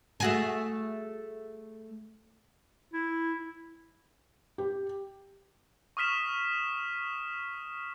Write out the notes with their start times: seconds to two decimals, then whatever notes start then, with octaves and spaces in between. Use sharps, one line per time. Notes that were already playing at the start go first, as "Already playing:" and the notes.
0.20 A3 F#4 G#4
2.93 E4
4.58 G4
5.97 C#6 D#6 F6 B6 E7